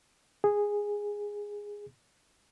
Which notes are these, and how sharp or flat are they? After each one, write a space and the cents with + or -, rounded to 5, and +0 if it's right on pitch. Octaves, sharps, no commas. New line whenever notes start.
G#4 -10